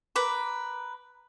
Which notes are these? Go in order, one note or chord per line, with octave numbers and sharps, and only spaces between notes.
A#4 B4 D6